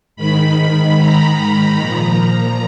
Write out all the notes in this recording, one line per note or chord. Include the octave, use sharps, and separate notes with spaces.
G#2 D#3 B5
A#5
A#5
A#2 F3 A#5